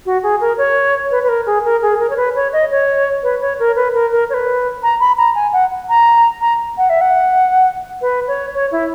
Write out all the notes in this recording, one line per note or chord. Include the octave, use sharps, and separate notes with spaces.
F#4
G#4
A#4
C#5
B4
B4
A#4
G#4
A#4
G#4
A#4
C#5
B4
C#5
D#5
C#5
B4
C#5
A#4
B4
A#4
A#4
C#5
B4
A#5
B5
A#5
G#5
F#5
A#5
A#5
F#5
E5
F#5
B4
C#5
C#5
E4